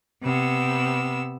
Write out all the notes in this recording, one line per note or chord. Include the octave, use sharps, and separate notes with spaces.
C3 B3 E6